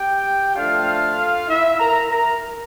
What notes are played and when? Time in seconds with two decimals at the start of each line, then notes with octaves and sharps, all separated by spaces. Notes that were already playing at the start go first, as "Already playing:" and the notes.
Already playing: G4 G5
0.55 D3 F3 A3 D4 F4 F5
1.48 E4 E5
1.78 A#4 A#5
2.09 A#4 A#5